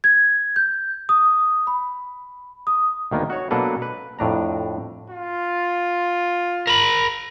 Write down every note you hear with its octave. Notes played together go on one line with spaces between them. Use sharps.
G#6
G6
D#6
B5
D#6
D2 D#3 A#3 B3
F#4 C#5
B2 F#3 A#3 D4 A4 B4
B4
F2 A2 D4 A#5
F4
A#4 B5